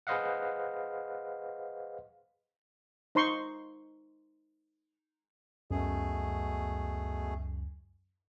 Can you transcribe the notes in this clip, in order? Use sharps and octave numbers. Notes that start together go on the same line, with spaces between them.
G#4 B4 C5 D#5 F5 F#5
D#4 C5 A#5 C6 C#6
C#2 F#2 B2 A3 G#4